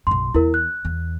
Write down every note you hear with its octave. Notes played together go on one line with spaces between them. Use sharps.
B1 F#2 C6
E2 E4 A#4
F#6
E2